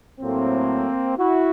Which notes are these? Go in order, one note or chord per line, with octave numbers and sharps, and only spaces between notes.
A2 F#3 A3 A#3 C4
E4 F#4